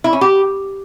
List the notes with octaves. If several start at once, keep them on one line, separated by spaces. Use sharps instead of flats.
E4
C#4
G4